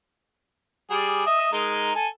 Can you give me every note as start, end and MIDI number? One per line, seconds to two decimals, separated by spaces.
0.91 1.26 55
0.91 1.26 68
1.26 1.52 75
1.26 1.52 76
1.53 1.91 56
1.53 1.91 63
1.53 1.91 70
1.95 2.07 69
1.95 2.07 80